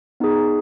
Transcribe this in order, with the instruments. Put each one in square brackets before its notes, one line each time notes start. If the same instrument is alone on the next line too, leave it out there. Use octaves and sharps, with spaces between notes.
[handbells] B3 D#4 G#4